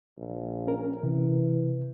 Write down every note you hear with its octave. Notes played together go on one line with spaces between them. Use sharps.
A#1
C#4 A#4
C3 E3